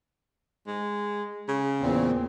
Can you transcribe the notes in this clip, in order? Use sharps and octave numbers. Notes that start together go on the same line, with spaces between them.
G#3
C#3
E2 A#2 C4